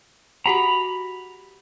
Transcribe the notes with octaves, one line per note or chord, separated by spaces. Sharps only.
F#4 G4 F#5 A#5 B5